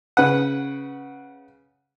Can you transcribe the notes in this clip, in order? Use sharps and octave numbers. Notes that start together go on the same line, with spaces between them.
C#3 B4 F#5